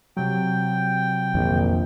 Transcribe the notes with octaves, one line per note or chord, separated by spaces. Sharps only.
C3 F#3 G5
A#1 F2 D#3